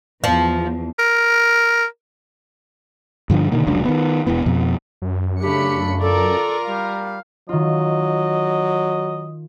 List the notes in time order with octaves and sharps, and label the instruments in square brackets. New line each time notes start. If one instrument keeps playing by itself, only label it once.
[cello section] E2 [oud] F3
[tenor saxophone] A#4
[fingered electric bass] G2 D3 F3 D4
B2 D3 D#3 A#3
F1 C#2 F#3 D4
D#3 B3
E1 E2 E3 B3
F2 B2
[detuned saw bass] F#2
[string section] C#3 A3 C#7 [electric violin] D4 B5 [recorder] G4
[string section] F4 A#4 [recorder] A4 [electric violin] D5
[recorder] G3 [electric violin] F5
[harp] D#3 F4 [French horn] F#3 [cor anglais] D#5